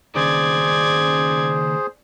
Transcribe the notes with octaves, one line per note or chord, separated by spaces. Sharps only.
D#2 C#3 G#4 C5 D5 G#6